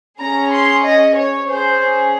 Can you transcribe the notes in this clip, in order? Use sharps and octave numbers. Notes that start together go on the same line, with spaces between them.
C#4 G#4 A#5
C6
D#5
C#5
C#4 G#4 C5